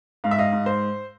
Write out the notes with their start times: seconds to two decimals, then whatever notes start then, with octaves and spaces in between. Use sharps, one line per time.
0.24 G#2 F5
0.31 E5
0.39 D#5 F5
0.52 G#2
0.66 C5